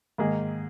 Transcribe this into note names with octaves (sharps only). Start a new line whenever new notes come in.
G#2 D#3 A#3 G#4